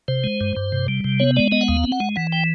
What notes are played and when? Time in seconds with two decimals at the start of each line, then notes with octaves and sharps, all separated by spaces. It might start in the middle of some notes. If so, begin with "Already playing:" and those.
0.08 C3 C5
0.24 G#3
0.41 G2
0.57 G2
0.72 C3
0.88 G3
1.04 C3
1.20 B3 C#5
1.36 G#3 D5
1.52 B3 D#5
1.61 F#5
1.68 D#2 F5
1.84 C4
1.92 F#5
2.00 G#3
2.16 E3 F#5
2.32 G5